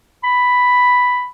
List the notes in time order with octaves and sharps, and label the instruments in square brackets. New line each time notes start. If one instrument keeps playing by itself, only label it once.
[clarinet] B5